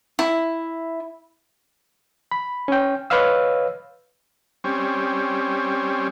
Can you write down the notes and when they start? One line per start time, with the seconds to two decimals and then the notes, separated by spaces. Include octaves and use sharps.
0.19 E4
2.31 B5
2.68 C#4 G5
3.10 B4 C#5 D#5 F5 E6
4.64 G3 C4 C#4